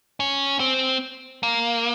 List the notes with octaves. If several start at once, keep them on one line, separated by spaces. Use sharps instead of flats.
C#4
C4
A#3